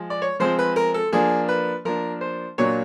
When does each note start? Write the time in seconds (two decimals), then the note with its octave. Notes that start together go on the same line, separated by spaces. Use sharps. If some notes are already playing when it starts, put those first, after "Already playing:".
Already playing: F3 G#3
0.10 D5
0.22 C#5
0.40 F3 G#3 C4 C5
0.59 B4
0.76 A#4
0.94 A4
1.13 F3 A#3 D4 G#4
1.48 B4
1.85 F3 A#3 D4 A#4
2.21 C5
2.58 A#2 F#3 A#3 D4 C#5